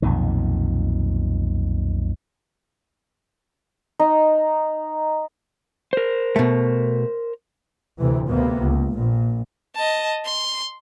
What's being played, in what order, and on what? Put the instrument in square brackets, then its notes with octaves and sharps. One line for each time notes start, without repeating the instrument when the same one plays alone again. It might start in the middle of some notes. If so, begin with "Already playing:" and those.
[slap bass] B1 F2 A#2 D#3
[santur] D#4
[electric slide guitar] A#4 C5
[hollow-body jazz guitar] B2 A3
[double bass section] D2 C3 E3
D2 C3 A#3 B3
C#2
A#1 A#2
[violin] D#5 A5
C6